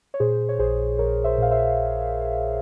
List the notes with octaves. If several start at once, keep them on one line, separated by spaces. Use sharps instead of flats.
C#5
A#2 G#4 C5
C#5
A#1 G#4 C5
A#1 A#4 C#5
C5 E5
A#2 F5
C5 E5